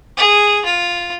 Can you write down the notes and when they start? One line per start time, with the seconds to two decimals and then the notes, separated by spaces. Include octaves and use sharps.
0.17 G#4
0.65 F4